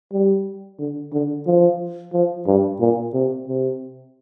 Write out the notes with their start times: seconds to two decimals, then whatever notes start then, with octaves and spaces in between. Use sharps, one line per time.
0.12 G3
0.79 D3
1.13 D3
1.46 F3
2.13 F3
2.46 G2
2.80 A#2
3.14 C3
3.48 C3